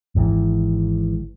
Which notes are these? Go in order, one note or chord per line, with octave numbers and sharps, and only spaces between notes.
G#1 G#2 D#3 E3